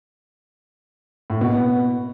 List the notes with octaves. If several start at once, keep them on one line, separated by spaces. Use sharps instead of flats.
A2
B2
B3